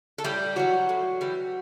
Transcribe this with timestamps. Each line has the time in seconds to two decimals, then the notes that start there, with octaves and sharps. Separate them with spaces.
0.18 A4
0.24 A2 G3 G4
0.56 E3 F#3 G3 F#4
0.89 A2
1.21 E3 G3